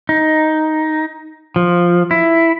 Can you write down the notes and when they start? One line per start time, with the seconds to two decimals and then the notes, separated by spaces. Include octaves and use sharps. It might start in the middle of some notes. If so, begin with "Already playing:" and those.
0.09 D#4
1.56 F3
2.11 E4